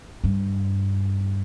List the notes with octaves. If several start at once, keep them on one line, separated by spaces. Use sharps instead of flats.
G2